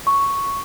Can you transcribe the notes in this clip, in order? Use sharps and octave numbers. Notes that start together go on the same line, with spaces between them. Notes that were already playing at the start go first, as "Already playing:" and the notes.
C#6